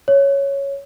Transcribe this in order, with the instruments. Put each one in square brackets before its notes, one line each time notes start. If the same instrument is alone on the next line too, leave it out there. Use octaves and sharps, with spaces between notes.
[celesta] C#5